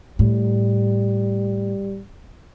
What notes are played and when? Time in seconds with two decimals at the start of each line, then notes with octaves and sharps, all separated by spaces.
0.19 A2 G3